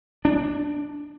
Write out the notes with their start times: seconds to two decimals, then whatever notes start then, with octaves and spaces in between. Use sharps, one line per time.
0.25 D4